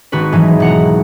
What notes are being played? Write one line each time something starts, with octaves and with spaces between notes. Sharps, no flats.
G#1 F#4 B4
G#2 E3 F#3 D#4
E1 F#5 A#5